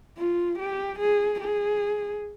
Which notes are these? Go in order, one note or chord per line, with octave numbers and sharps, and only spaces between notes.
F4
G4
G#4
G#4